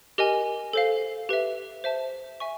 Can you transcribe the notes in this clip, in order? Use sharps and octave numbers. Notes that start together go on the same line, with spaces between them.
G4 A#4 D#5 G#5
A4 C5 F5
G4 B4 E5
C5 E5 A5
E5 G#5 C#6